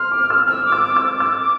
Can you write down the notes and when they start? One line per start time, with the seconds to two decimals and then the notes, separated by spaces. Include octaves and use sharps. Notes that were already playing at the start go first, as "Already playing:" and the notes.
Already playing: C6 F6
0.12 D6
0.30 E6
0.48 E6 F6
0.66 D6
0.72 E6
0.84 D6
0.96 E6
1.03 D6
1.20 E6